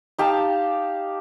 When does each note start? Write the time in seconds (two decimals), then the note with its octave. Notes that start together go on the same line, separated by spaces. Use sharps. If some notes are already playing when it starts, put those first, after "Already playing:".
0.18 D#4 G4 F5 A5